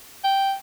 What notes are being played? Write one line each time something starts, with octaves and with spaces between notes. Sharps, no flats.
G5